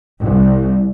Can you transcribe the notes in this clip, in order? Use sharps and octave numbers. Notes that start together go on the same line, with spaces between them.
C2